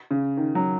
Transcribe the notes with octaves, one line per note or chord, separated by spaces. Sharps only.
C#3
D#3
F#3